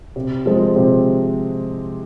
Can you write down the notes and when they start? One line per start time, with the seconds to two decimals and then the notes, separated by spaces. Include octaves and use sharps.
0.16 C3
0.46 F3 G#3 C4
0.76 C3